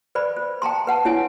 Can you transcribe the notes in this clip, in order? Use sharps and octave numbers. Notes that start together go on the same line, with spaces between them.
B4 C5 D5 B5
C5
G5 A5 A#5 C6
B4 F#5 A5
D4 E4 C#5 G#5